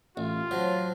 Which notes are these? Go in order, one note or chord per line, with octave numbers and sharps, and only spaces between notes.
A1 F4
F#3 C5 C#5 A5